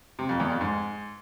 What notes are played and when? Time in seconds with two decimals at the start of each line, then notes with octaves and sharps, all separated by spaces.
0.19 C3
0.29 F2
0.40 E2
0.50 F2
0.61 G#2